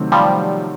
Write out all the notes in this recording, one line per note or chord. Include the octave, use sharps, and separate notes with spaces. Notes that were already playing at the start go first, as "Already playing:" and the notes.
Already playing: C3 D#3 F#3 A3 C4
F3 G3